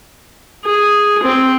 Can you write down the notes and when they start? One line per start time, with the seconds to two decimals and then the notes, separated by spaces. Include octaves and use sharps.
0.65 G#4
1.24 C4